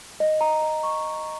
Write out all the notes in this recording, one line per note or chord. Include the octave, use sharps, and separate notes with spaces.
D#5
A#5
D#5
C#6